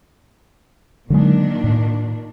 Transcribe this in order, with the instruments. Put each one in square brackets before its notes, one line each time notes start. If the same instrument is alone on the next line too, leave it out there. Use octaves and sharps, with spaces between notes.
[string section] A#2 D#3 D4 [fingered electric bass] D3 F#3 G#3
[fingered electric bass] A2